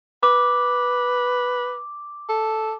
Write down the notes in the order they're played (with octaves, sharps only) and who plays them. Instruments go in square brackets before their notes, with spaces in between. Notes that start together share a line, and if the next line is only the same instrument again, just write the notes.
[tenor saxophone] B4 [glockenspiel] D6
[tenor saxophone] A4